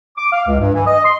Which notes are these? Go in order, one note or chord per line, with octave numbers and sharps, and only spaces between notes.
D6
F5
C#2
G2
E3
D#5
C6